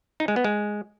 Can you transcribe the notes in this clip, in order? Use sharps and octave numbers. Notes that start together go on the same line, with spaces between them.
D#4
G#3
B3
G#3